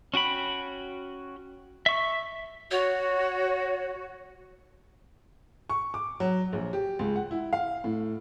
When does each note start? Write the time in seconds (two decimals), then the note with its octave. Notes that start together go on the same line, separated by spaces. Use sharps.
0.14 C#4 F#4 G5 B5
1.86 E5 C#6
2.71 F#4 C#5
5.70 C#6
5.94 D6
6.20 F#3
6.53 A#1
6.73 G4
6.99 C#2
7.16 F#5
7.31 E4
7.53 F5
7.84 A2